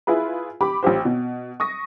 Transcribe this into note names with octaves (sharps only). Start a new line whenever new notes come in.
E4 F4 G#4 B4
G4 B5 D6
A1 F4 G4 C5
B2
C#6 D#6 A#6